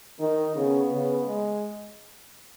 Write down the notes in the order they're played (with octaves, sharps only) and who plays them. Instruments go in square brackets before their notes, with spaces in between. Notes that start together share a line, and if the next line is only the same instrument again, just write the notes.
[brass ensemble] D#3 [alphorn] D#4
[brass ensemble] C#3 [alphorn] B3
[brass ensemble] C#3
[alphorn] G#3